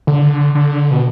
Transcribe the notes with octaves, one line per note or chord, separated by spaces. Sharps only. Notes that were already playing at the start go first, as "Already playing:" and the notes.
D3
D3
B2